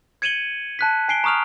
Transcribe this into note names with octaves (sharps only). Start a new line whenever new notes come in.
G#6 C#7 D#7 E7 F#7 G7
A5 F#6 B6
G#5 C7 D7 G7
A#5 C#6 D#6 F6 F7